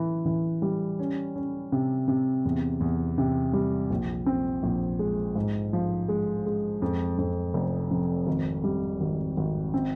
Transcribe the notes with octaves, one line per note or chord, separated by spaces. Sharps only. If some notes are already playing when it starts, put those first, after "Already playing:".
Already playing: E3
E3
G3
C#4
C#4
C3
C3
E2
E2
C3
G3
A#1
C4
A#1
G#3
G#2
F3
G#3
G#3
F2
F2
F1
F2
G#1
G3
G#1
G#1
C4